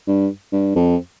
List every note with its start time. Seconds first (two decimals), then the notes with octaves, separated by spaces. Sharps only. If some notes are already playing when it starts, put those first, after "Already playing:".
0.07 G2
0.52 G2
0.75 F2